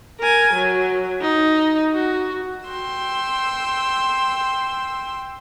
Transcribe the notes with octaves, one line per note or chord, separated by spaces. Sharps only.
A#4 G#5
F#3
D#4
F#4
G5 C6 E6